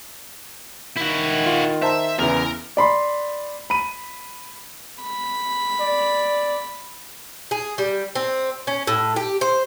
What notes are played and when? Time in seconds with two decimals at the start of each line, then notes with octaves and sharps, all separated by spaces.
0.97 D#3 E4 F#4
1.46 F4
1.82 C5 E5 A5 A#5
2.19 E2 C#3 E3 A#4 A#5
2.77 D5 B5 C6
3.70 B5 D#7
5.04 B5
5.81 D5
7.51 G#4
7.78 G3
8.15 C4
8.67 C#4
8.87 A2
9.16 G4
9.41 C5